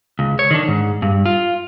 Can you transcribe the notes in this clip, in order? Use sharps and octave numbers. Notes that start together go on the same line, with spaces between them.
C#2
C#5
D#3 D4
G#2
G2
F4